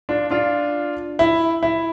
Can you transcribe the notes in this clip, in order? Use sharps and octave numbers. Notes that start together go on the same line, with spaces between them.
D4 F4
D4 F4
E4
E4